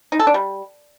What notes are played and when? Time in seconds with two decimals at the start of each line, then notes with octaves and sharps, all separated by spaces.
0.12 D#4
0.19 A4
0.27 D4
0.34 G3